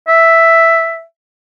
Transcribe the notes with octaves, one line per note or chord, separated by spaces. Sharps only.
E5